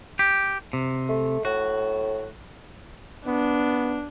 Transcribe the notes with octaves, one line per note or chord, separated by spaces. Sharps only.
G4
C3
A3
A2 F#4
B3 D4